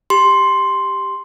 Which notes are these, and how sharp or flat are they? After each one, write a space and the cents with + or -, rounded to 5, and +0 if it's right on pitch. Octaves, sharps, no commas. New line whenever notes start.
G4 +0 C6 +0